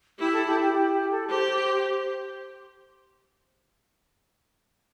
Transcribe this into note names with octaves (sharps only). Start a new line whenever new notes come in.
E4 G4
A4
G4
G4
G4
G4
A4
G4 C5